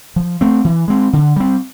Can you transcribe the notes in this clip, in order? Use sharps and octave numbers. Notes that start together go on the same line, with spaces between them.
F3
A3 C4
E3
G#3 C4
D3
G3 C4